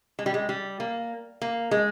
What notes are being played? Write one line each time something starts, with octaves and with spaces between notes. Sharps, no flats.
G#3
G3
G#3
G3
A#3
A#3
G#3